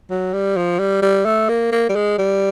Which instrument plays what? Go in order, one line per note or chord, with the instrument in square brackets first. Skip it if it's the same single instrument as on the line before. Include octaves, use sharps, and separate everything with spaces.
[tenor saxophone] F#3
G3
F3
G3
G3
A3
A#3
A#3
G3
G#3
G3